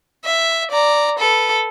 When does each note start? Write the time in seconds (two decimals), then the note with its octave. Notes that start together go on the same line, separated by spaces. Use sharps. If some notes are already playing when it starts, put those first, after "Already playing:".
0.25 E5
0.71 D5 A#5
1.19 A4 B4